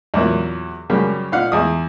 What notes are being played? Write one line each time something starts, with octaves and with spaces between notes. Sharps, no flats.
E2 A#2 F#3 A#3
F#2 C#3 G3 A#3
A#2 D#4 F5 F#5
E2 G#4 D#6